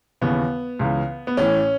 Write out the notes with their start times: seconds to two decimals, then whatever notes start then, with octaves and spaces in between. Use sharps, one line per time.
0.21 D#2 C#3 E3 B3
0.79 C#2 C#3 E3
1.27 B3
1.37 A1 A2 E3 C#4